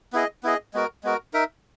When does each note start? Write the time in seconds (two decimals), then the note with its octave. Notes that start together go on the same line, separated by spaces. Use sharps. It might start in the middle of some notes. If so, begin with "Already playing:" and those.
0.13 B3 E4 G#4 D#5
0.43 B3 E4 G#4 D#5
0.74 G#3 B3 F#4 A#4
1.03 G#3 B3 F#4 A#4
1.34 D#4 A#4 E5